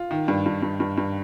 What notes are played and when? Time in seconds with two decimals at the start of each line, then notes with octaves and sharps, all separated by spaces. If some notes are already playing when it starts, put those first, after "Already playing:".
Already playing: F4
0.11 D#3
0.28 G2
0.46 G2
0.62 G2
0.80 G2
0.98 G2